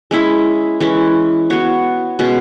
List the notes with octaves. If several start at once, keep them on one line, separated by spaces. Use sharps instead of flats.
G#3 C#4 E4 G#4
E3 G#3 C#4
B3 F#4 C#5
B2 G#3 C#4